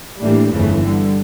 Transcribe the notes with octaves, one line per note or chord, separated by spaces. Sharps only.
A2 E3 G3 A#3 D4
G1 F2 C#3 E3 A3
G2 D3 G3